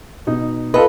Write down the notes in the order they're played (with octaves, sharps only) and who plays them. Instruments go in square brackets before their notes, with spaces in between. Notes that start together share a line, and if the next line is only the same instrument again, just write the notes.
[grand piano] B2 D#4
[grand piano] F4 A4 D#5 [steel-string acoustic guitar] B4